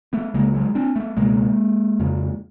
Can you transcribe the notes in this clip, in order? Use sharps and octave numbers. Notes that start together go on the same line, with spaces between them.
A3 B3
C#2 C#3 G#3 A#3
F#3 G#3
C4 D4
A3 B3
C#2 B2 G#3 A#3
F2 C#3